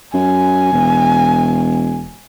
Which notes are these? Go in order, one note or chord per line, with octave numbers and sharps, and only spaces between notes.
F#2 G#5
E1